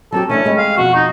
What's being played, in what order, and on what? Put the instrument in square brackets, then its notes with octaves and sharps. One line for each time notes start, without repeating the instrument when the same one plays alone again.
[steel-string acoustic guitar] F#3 C4 G4 [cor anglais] A4
[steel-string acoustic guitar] E3 A3 D4 [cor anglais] C#4
[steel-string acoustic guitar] G3 G#3 C4
[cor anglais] F5
[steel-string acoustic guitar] F2 B2 [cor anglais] F#4
[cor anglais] D#4